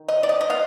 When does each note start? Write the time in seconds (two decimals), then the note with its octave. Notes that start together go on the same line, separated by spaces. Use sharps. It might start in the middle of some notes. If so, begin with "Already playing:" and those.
Already playing: D#3
0.08 D#5
0.23 D5
0.29 D#5
0.41 D#5
0.50 B3 F5